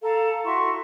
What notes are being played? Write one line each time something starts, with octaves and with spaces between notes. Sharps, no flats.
A4 F5 A#5
E4 F#4 C6 C#6